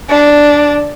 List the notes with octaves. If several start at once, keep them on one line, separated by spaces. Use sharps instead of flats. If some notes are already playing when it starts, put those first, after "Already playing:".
D4